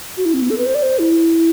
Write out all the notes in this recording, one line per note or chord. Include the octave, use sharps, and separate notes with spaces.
F#4
E4
C4
B3
A4
B4
C5
D5
C5
E4